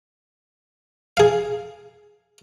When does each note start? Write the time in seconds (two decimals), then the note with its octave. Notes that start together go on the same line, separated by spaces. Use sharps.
1.17 G#4 F5